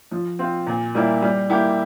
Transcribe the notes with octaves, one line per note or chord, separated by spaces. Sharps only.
F3
C4 F4
A#2
G3 A#3 E4
G3
A#3 E4 G4